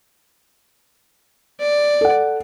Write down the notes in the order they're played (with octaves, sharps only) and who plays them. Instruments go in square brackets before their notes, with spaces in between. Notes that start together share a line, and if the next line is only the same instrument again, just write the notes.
[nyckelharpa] D5
[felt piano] A4 F#5